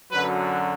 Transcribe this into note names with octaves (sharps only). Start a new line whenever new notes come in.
F#2 D3 F#3 B4